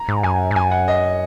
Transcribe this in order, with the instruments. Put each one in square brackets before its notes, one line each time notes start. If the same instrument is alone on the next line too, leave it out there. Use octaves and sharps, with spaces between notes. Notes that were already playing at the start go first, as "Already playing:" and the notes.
Already playing: [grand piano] A#5
[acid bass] G#2
[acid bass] F#2 [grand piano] G#5
[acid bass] G#2
[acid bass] F#2 [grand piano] G#5
[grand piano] F#5
D#5